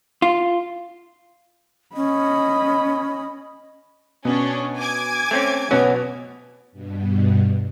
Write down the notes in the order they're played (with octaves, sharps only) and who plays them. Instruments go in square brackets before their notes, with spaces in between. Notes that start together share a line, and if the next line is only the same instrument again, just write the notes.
[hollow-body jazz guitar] F4
[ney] C#4 [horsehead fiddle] D#5 B5
[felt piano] B2 [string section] C#4 D4
[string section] G#5 D6 G#6
[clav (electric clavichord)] A3 C4 C#4
[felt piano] B2 B3 [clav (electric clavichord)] F#3 C#4 F#4
[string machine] G2 B2